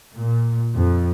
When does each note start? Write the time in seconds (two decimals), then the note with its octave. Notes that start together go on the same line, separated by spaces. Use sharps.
0.16 A#2
0.76 F2